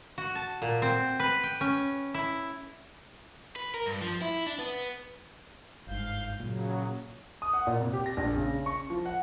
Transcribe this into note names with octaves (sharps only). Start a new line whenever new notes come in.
F#4
A5
A#2
C4
B4
G5
C#4
E4
B4
A#4
G2
F3
E4
D4
B3
G1 G#2 F5 G6
A#2 C#3 F#3
D#6
F#5
A#2
C3
G4
A#6
A#1
C#3
C#6
F3
F#5